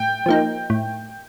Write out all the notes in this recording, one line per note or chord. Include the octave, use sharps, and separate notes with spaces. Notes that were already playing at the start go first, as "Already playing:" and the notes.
Already playing: A2 G5
F3 A#3 D#4
A2